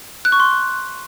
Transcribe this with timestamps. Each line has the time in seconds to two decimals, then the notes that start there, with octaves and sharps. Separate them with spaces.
0.25 F#6
0.32 C#6
0.40 C6